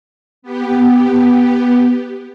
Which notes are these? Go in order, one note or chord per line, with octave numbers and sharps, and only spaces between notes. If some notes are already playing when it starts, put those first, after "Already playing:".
B3 G4